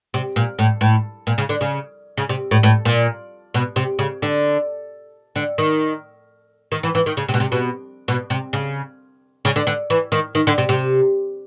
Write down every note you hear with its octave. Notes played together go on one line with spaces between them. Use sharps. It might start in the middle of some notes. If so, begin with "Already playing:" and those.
C3
A#2
A2
A2
A#2
C#3
D3
C#3
C#3
C3
A2
A2
A#2
B2
C3
C#3
D3
D3
D#3
D#3
E3
E3
D#3
C#3
C3
B2
C3
B2
B2
C3
C#3
C#3
D3
D3
E3
D#3
D#3
D3
C3
C3